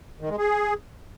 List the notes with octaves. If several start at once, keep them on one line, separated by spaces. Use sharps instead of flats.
D#3
G#3
G#4